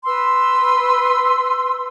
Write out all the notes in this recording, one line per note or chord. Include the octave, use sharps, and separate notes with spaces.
B4 C6 E6